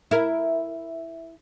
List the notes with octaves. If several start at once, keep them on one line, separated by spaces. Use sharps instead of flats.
E4 A#4